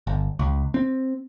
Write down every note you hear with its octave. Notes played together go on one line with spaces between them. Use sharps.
G1
C#2
C4